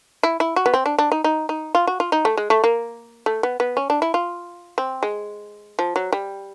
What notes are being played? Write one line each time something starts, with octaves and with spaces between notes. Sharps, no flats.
E4
E4
F#4
B3
C4
D4
D4
D#4
D#4
D#4
F4
F#4
F4
D#4
A3
G#3
A3
A#3
A3
B3
B3
C#4
D4
E4
F4
C4
G#3
F3
F#3
G3